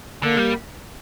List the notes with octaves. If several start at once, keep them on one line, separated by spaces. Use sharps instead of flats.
D3 A#3
G3